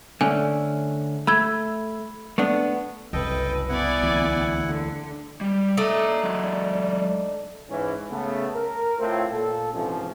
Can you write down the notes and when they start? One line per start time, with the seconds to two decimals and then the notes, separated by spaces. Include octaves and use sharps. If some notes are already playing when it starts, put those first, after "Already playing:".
0.21 D3 A3 C#4 G#5
1.27 A3 B5 E6 G#6
2.38 A3 B3 D4
3.13 F#1 C2 A4 B4 D#5 G5
3.69 B3 E4 D5 F#5 G#5
4.03 D2 E3
4.69 D3
5.41 G3
5.77 A3 D4 D#4 D5 A#5
6.23 F#3 G#3
7.70 G#2 E3 C#4
8.11 C#3 A3 B3
8.54 A#4
8.99 A2 C4 F4
9.32 A#2 A4
9.73 G#2 C3 E3 F3 G#3 C#4